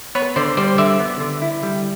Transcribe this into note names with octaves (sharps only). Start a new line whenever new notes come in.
B3 B4 C#5
D3 C5 D5
G3 C5 D5
D3 D5 E5
B3
D3
E4
G3